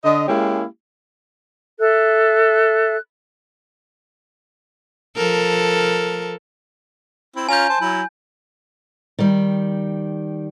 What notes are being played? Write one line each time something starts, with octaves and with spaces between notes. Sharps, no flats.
D3 D#5
G#3 A#3 C#4 E4 G4
A4 E5 F#6
F3 A4 A#4
C4 E4
C#4 F4 G#5 A#5 G6
C5 A5
F#3 E4
D#3 G3